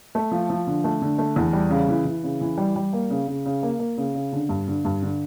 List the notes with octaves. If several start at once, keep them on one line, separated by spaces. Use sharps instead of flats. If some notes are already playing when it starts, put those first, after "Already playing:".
A3
F3
F3
D3
A3
D3
A3
E2
G3
C#3
E3
E3
C#3
E3
G3
G3
A#3
C#3
C#3
C#3
A#3
A#3
C#3
C#3
D3
G2
D3
G2
D3